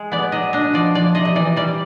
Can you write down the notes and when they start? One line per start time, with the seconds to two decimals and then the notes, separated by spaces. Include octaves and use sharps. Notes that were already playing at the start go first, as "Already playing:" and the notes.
Already playing: G#3
0.12 B3 D5
0.32 F#3 D#5
0.53 D4 D#5
0.73 F3 D5
0.95 F3 D5
1.15 C3 D#5
1.25 D#5
1.35 E3 D5
1.56 G3 D5